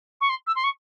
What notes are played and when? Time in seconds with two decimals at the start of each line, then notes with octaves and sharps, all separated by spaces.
0.21 C#6
0.29 C6
0.47 E6
0.56 C6
0.64 C#6